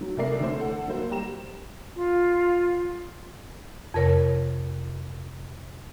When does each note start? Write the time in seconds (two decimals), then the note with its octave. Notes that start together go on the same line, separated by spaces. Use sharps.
0.01 F#3
0.17 C2 C3 A3 A#4 D5 C7
0.39 D3 E3 A3 C5
0.60 A4 F#5
0.88 F#3 A#3 C5
1.10 G3 G4 A#5 E7
1.95 F4
3.94 F2 C3 A#4 C#5